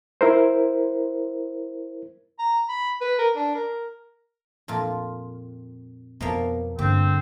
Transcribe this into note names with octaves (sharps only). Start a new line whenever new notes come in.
E4 A#4 C5
A#5
B5
B4
A#4
D4
A#4
F2 A#2 F4
F2 B2 F3 A#3 B3
G2 D3 A#3 C4 G4